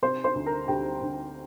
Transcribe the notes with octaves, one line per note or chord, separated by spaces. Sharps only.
C3 C5 C6
C5 C6
D2
A#4 A#5
D2 G4 G5
D2